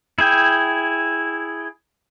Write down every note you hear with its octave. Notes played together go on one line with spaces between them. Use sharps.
E4 G#4 G5